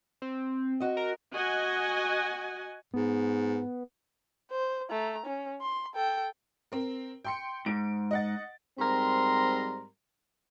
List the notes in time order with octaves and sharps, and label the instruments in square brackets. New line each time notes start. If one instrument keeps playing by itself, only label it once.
[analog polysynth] C4
[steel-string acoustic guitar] F#4 D#5
[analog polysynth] A#4
[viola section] F#4 D#5 F#5 G#5
[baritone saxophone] G#2 [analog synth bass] B3
[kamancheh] C5
A3 A#5
C#4
C6
A4 G5
[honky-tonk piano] C4 A#4
G5 C6 C#7
[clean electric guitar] G#2 [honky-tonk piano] D7
[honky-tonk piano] D#5 F#5 A6
[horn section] G#2 G3 C4 A#4 A#5 C6